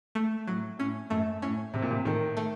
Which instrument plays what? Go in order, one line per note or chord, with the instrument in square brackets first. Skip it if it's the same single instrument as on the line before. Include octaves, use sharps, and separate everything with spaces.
[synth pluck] A3
[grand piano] A2 [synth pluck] F#3
[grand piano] A2 [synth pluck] C#4
[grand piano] F#2 [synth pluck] A3
[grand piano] A2 [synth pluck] C#4
[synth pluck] A2 [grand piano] C3
[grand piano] A#2
C3
[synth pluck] A2 [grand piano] D#3
[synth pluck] A3